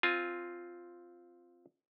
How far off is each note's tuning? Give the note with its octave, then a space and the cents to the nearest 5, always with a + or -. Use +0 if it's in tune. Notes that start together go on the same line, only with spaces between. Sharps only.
C4 +0 F4 +0 G#5 +0